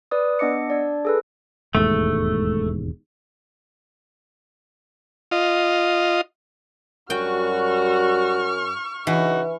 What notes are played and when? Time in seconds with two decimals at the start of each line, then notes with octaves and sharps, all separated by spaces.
0.11 B4 D5 D#6
0.39 B3 D4 D#5 D6 C#7
0.70 D4 D5
1.05 G#4 A4 B4
1.75 E1 D#2 G#2 A3
5.31 F4 D#5
7.10 F#2 G3 F#4 G5 C#6 F6
9.07 C#3 E3 D#4 F#4